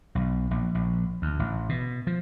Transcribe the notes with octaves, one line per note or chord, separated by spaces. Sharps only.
B1
A#1
A#1
D2
A1
B2
F3